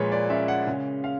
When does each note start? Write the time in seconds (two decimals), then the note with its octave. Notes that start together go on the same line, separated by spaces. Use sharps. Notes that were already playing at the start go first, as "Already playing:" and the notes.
Already playing: A#2 F3 G#3 A#4 B4 C#5
0.12 D5
0.30 C#4 E5
0.48 F#5
0.67 C#3
1.04 F5